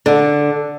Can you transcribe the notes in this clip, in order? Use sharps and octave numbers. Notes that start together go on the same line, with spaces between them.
D3